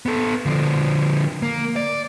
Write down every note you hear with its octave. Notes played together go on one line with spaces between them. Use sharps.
B3 A4
D3 F3
A#3
D5